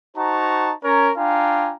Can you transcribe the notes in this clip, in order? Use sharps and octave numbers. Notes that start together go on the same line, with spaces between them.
D#4 F#4 C5 A5 A#5 C#6
C#4 A#4 C#5 A#5
D4 F4 F5 G5 G#5 A#5